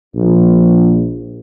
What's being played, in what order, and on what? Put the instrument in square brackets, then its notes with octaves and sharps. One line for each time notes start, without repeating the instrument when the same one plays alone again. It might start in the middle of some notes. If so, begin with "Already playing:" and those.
[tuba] A#1